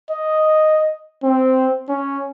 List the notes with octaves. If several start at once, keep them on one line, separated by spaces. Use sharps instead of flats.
D#5
C4
C#4